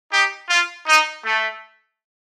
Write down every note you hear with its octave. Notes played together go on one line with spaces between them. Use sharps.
D#4 G4
F4
D#4
A3